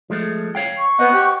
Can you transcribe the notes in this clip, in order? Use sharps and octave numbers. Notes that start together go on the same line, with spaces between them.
F3 G#3 A3
C#5 F5 G5
C#6
B3 C5 D#5 F#5
G4